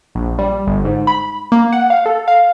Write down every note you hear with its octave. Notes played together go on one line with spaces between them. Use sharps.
A#1
G3
G1
G#2
B5
A#3
F#5
F5
A4
F5